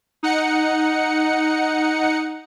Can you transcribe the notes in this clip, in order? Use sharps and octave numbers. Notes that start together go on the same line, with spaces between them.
D#4 F#5 C#7